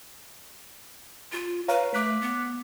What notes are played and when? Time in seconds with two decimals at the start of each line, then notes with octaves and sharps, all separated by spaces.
1.32 F4
1.68 B4 C#5 F5 A#5
1.94 A3 D6 F#6 B6
2.21 B3